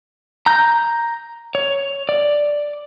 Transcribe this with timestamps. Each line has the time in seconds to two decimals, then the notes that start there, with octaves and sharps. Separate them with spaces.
0.46 A#5 G6
1.55 C#5
2.09 D5